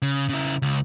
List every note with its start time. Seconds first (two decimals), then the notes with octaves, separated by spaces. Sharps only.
0.02 C#3
0.29 C#3 E4
0.62 C#2